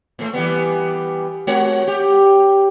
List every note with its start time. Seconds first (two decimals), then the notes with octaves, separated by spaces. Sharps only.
0.19 A2 A3
0.33 E3 G3 B3
1.47 G#3 F#4 C#5
1.87 G4